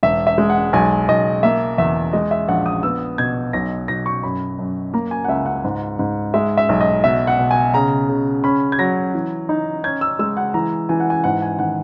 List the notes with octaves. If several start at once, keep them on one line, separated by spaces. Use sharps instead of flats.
E1 E5
E5
G#3
F#5
B1 G#5
B1 D#5
A#3 E5
E2 E5
G#3 D#5
E5
A#1 F#5
D#6
B3 E6
B2 G#6
B1 A#6
B1 A#6
C#6
F#2 B5
F#2
A#3 A#5
G#5
F#5
C#2 E5
F#5
G#2
G#2
G#3 E5
E5
B1
D#5
B2 E5
F#5
B2
G#5
C#3 A#5
C#3
C#4 B5
G#6
F#3 A#6
E3
D#4
C#4 G#6
E6
G#3 E6
F#5
E3 A#5
E3 G#5
F#5
G#5
G#2 F#5
G#5
D#3 F#5